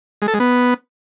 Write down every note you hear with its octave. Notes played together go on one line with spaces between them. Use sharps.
G#3
A4
G#3
B3